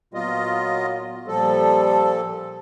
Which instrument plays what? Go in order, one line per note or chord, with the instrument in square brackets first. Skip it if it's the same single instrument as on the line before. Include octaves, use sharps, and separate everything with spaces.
[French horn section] A#2 F#3 B3 [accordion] F4 D#5
[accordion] A#2 F3 A4 [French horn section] G3 C5